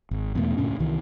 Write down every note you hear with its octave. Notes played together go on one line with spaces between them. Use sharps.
G#1
E2 B2 A3
D2 G2 A#2 C#4
C2 D#3 E3